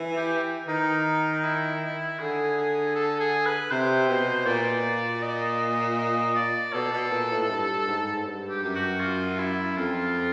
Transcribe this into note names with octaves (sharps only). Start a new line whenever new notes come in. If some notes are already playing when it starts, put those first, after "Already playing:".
Already playing: E3
G4
D#3 D#4
E4
D3 G#4
G#4
A4
G#4
B4
C3 C5
B2
A#2 D5
D#5
D#5
D5
B2 A4
B2
A#2
A2
G2
G#2
G#2
G2
G4
F#2
F#4
F4
E4
F2 F4